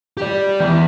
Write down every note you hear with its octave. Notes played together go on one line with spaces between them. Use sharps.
G4 D5
E2 E4